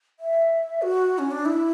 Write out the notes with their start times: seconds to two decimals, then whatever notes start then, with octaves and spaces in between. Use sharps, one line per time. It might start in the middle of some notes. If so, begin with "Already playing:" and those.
0.20 E5
0.82 F#4
1.18 C#4
1.31 D4
1.45 E4